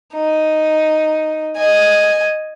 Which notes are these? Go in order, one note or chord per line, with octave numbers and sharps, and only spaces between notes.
D#4
D#5 G#5